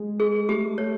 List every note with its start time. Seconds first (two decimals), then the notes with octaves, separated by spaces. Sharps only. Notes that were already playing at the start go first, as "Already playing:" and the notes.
Already playing: G#3
0.20 G#4
0.48 A3 G4
0.78 A3 C#5